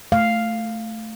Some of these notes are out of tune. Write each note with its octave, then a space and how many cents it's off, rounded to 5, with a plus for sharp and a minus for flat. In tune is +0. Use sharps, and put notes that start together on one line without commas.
A3 +0 F5 +0